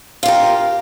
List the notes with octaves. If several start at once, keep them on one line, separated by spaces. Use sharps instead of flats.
F4 G4 A#4